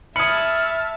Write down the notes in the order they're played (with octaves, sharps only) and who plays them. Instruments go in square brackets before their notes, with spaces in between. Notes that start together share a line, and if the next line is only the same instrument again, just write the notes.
[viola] E5 A5 [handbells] B5 G#6 [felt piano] D#6 C#7 [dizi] F6